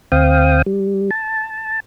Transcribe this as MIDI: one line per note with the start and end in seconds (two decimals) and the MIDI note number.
0.12 0.62 38
0.12 0.62 60
0.12 0.62 77
0.12 0.62 79
0.12 0.62 87
0.66 1.10 55
1.11 1.80 81